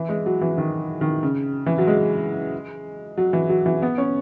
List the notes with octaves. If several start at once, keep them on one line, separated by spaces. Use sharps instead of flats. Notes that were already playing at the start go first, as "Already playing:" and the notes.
Already playing: E3
G#3
F#3
E3
D#3
D#3
C#3
E3
F#3
G#3
F#3
E3
F#3
E3
B3
C#4